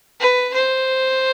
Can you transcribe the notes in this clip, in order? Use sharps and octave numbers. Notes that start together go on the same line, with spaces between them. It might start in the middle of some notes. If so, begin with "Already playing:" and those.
B4
C5